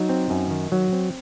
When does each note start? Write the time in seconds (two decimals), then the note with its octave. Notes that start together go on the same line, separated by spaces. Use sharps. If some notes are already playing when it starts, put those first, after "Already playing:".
Already playing: F#3 D#4
0.09 C4
0.30 F#2
0.51 D#3
0.72 F#3
0.92 C4